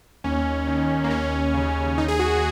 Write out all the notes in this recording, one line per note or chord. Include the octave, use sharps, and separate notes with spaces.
D#2 C#4
D#3
A#3
D#2 C#4
C#3
D#2 D#4
G#4
F#4